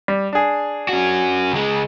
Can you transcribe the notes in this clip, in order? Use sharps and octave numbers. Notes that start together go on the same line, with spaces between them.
G3
D4 G#4
C#4 F#4
C#2 G#3